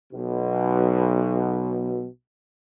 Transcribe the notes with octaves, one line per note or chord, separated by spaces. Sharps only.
B1 B2